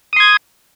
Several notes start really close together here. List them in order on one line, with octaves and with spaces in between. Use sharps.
D#6 C6 G#6